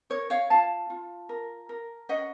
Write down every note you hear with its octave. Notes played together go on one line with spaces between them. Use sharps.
A#4 C#5
C#5 F5
F4 F5 A5
F4
A#4
A#4
C#4 D#5 F#5